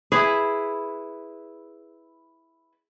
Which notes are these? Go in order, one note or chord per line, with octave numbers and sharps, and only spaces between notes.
E4 G#4 B4